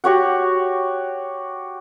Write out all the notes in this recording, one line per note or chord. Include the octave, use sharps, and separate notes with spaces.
F#4 G4 C#5 F#5